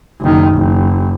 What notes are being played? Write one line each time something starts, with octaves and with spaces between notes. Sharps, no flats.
F#1 D#3
F#1